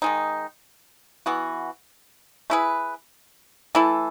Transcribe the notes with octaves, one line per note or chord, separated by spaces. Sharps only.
D#3 G#3 D#4
E3 B3 F#4
A3 E4 G#4 B4
E3 A3 E4 A4